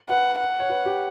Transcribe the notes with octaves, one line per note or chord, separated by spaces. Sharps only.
B4 F#5
F#5
C#5
B4
G4